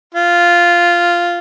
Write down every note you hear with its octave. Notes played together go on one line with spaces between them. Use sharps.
F4